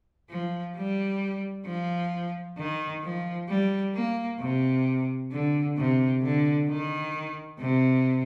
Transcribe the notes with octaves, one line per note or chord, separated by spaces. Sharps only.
F3
G3
F3
D#3
F3
G3
A#3
C3
D3
C3
D3
D#3
C3